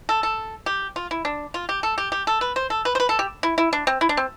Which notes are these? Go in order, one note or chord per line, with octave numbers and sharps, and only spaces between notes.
A4
A4
G4
F4
E4
D4
F4
G4
A4
G4
G4
A4
B4
C5
A4
B4
C5
B4
A4
G4
E4
E4
D4
C4
E4
D4
C4